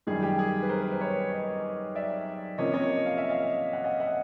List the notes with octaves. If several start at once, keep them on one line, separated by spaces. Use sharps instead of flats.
F#2 D#3 G3 G#4
G4
G#4
B4
A#4 C5
B4
C5
B4 C#5
C#5 D#5
D5 E5
C3 F3 A#3 C#4 C#5 D#5
C#5 D#5
F5
E5
D#5 F5
F#5
D#5 F5
E5 F#5